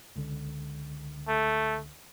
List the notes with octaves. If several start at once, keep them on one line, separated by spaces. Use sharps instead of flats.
C#2 D3
A3